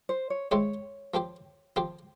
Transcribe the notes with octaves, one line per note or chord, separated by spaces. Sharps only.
C5
C#5
G#3 C4 E4 G4 C5 C#5
F3 C4 G4 C5
F3 C4 G4 C5